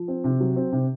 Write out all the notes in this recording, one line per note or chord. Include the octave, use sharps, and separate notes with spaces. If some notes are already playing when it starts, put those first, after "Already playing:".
Already playing: F3
C4
C3
F#3
C4
C3